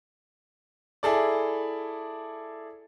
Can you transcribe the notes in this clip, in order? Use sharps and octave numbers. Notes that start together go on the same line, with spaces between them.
E4 G#4 A4 D5